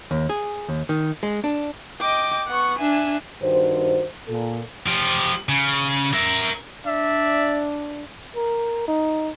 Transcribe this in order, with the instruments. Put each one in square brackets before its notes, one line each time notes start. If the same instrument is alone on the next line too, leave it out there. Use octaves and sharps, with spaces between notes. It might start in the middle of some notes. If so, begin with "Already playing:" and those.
[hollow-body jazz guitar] D#2
G#4
D#2
D#3
G#3
D4
[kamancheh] D#5 G5 [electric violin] D6
[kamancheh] B3 C#6 [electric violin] F#5
[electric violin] D4 [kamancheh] E5 G#5
[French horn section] G2 D#3 F#4 C5
A#2 A4
[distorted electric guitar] F3 G4
C#3
A#4 E5
[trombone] D4 [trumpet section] D5 E5
[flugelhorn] A#4
D#4